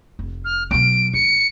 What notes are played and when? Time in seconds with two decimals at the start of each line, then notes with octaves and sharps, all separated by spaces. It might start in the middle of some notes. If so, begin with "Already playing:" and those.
0.19 F1
0.45 F6
0.71 B2 F#3 D7
1.14 D#2 C#7